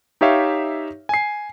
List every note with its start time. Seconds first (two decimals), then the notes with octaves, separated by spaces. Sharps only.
0.21 D#4 G4 C#5 E5 F5
1.09 G#5 C7